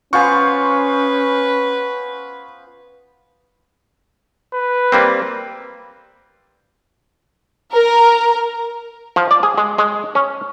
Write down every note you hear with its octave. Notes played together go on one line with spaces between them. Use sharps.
B3 C#4 F4 B4 C5 G#5 C#6
B4
G3 A#3 C4
A#4 A#5
F3
D5
G#4
G#3
G#3
C#4